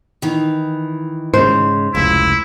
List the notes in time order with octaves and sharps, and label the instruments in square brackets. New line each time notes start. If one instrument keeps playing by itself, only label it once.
[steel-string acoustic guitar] D#3 E3
[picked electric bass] G#2 C#3 [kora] C5
[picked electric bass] F1 C#2 [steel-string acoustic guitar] A#3 [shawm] E4